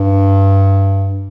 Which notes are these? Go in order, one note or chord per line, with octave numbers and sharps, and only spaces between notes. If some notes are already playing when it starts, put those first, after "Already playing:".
Already playing: G2